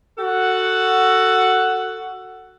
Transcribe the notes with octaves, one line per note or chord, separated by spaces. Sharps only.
F#4 A4 F#5